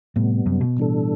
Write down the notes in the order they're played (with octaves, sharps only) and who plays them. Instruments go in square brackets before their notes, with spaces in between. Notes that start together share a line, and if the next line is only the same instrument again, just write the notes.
[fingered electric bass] A2 [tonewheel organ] C3 G3 B3
[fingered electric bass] F#2
B2
[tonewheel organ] A2 E3 G3 D4 A4